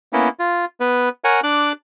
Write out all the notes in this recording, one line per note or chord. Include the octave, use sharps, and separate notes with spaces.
A#3 B3 C#4 E4
F4
B3 B4
A#4 C#5 F#5 G#5
D4 D6 F#6